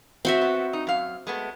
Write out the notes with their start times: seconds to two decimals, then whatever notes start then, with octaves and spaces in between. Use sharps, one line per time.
0.25 C4 F#4 E5
0.42 B3
0.73 D#4
0.87 F#2 F5
1.27 G#3 A3 B3